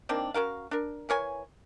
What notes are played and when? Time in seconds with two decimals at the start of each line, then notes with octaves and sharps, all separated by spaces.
0.09 D#3 A#3 C4 D4
0.34 C#4 F#4 A#4 F5
0.71 D4 A#4
1.09 E3 A#4 C#5 G#5